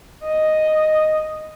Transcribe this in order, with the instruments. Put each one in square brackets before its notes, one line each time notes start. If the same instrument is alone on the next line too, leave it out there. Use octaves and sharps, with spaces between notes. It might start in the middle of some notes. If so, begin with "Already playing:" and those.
[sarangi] D#5